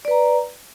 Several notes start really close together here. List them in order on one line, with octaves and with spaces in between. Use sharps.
D5 B4 A#5